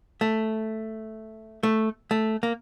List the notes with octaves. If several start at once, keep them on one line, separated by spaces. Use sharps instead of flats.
A3
A3
A3
A#3